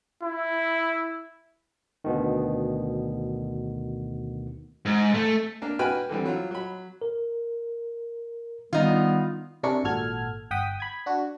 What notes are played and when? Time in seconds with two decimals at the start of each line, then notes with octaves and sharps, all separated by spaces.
0.23 E4
2.04 D2 B2 D#3
4.85 G#2
5.14 A3
5.62 A#3 D4 A#4
5.79 F#4 B4 G5 G#5 B5 F6
6.09 D3 E3 G3 C4
6.25 F#3 F4
6.51 F#3 B5
7.02 A#4
8.73 D#3 G3 B3 D#4 F4
9.63 C3 D4 E4 G#4 A#4 C#6
9.84 G#1 A#2 F#4 A4 F6 G#6
10.51 G1 F#5 G5 D#6 B6
10.80 B5 G#6
11.06 D4 F#4